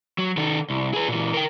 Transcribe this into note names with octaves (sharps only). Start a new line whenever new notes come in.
F#3
D#3 A4
C2
G#4 B4
A#2 E3
A#4 G5